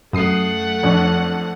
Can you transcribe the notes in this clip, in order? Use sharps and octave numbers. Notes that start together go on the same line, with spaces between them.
F#2 A3 F#5 D#6 C7
F2 F3 D4 C#6